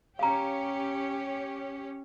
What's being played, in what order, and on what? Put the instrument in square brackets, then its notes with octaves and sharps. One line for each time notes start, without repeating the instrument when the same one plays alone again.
[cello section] C#4 G4 C#5 [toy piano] F5 A#5